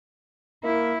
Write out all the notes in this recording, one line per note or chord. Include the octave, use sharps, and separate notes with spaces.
A#3 E4